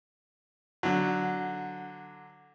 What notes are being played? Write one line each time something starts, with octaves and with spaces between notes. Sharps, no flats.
D3 F#3